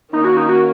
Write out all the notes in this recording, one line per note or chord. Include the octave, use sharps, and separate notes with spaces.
D#3 A#3 C#4 D#4
F#4
D#4
F#4